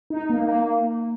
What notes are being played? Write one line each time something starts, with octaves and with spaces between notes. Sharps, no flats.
D#4
A#3
A#3